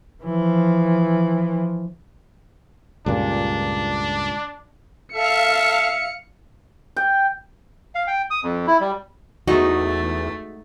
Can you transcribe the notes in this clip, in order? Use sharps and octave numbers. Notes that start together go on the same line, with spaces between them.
E3 F3
C#2 G2 A#2 D4
A4 E5 F5 A5 C#7
G5
F5
G5
D#6
F2
E4
G3
E2 G#3 A3 D#4 F#4